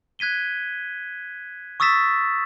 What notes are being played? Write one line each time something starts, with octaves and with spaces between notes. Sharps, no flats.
F#6 G#6 B6 D#7 G7
C#6 D#6 E6 A6 B6 E7